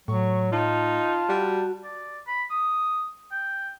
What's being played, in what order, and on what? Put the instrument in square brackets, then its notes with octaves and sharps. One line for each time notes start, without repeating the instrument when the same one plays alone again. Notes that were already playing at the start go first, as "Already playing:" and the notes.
[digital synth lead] A2 [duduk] F#3 [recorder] C#6
[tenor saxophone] D#4 [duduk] F4 [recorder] A5
[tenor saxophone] G3 [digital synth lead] F#4
[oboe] D5
B5
D#6
G5